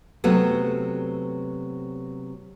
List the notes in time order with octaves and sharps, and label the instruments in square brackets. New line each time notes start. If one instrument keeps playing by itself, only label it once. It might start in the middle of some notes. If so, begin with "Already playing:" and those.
[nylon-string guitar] C3 F#3 A3 B3